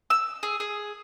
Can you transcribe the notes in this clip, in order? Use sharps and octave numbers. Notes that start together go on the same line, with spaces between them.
E6
G#4
G#4